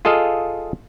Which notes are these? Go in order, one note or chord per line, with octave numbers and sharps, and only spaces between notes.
F4 G#4 A4 D#5 F5